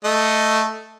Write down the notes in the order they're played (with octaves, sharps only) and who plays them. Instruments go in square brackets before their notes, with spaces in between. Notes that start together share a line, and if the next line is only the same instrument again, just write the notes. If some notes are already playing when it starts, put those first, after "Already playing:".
[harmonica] A3 D#5